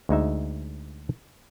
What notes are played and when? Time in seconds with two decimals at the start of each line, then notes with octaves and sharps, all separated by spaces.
0.09 D2 G#3 D#4 E5